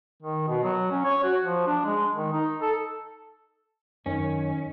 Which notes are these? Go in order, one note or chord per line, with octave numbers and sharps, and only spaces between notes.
D#3
B2
F#3
C#4
C#5
F#4
F3
D4
G#3
D#3
D#4
A4
F#2 D#3 C#4